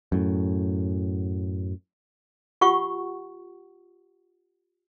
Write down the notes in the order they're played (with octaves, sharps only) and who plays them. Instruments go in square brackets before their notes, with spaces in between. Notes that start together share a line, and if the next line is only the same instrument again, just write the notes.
[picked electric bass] F#2 A2
[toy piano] F4 G4 F#5 C#6